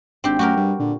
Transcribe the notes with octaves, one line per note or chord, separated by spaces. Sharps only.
G#1 C4 D4 G4
F#2 A3 F#4 G4 A#4
G2 G3
A#2 D3